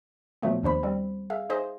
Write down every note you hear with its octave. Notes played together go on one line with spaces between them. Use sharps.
A#2 F3 F#3 A3 B3
D#2 D4 C5 B5
G3 C4
G#4 E5 F5
D#4 G#4 C5 D#5